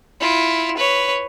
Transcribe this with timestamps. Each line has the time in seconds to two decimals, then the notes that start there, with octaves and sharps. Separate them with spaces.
0.20 E4 F4
0.77 B4 C#5